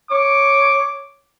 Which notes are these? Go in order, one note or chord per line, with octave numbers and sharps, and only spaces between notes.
C#5 D6